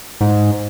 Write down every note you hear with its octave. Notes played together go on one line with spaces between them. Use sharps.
G#2